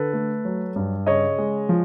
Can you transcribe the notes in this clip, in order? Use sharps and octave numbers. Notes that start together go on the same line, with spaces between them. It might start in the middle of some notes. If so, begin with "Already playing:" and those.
Already playing: D3 A4 B4
A3
F#3
G2
C#3 C#5 D#5
G#3
F3